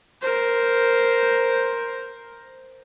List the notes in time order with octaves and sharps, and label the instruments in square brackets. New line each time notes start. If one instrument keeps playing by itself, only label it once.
[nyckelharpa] A#4 C5